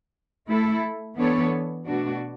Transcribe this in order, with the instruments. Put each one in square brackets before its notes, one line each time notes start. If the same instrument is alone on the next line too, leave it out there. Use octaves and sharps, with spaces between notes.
[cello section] A3 E4 A4
E3 B3 D4 A4 C#5
B2 A3 D4 F#4